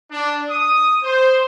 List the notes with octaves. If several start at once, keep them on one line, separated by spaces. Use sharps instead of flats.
D4
D#6
C5